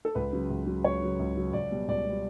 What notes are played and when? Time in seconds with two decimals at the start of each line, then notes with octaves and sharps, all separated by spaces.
0.05 A4
0.15 C#2 B4
0.33 C#3 F#3
0.50 C#2
0.66 C#3 F#3
0.84 C#2 C#5
1.02 C#3 F#3
1.19 C#2
1.37 C#3 F#3
1.53 C#2 D5
1.71 B2 G3
1.88 C#2 D5
2.05 B2 G3